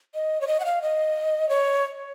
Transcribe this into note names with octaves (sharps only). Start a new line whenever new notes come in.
D#5
C#5
D#5
F#5
F5
D#5
C#5